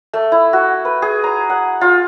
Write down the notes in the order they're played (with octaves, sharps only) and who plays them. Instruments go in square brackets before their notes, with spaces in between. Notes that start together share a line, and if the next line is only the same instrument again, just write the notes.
[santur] A3
E4
F#4
B4
G#4
A#5
F#5
F4